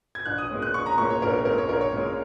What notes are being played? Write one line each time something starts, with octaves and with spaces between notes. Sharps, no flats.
G#6
A#1 F#6
D#6
A#2 G#3 C#4
F#6
A#1 C#6
A#5
A#2 G#3 C#4 C#6
C#5
A#1 A#4
A#4
A#2 G#3 C#4 A#4
C#5
A#1 A#4
C#5
A#2 G#3 C#4